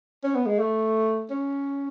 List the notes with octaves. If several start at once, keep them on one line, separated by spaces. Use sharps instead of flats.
C#4
B3
G#3
A3
C#4